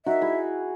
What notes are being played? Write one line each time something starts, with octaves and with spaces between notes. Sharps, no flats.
D#4 F#4 E5
E4 G#4